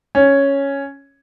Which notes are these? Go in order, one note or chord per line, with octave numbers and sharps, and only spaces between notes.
C#4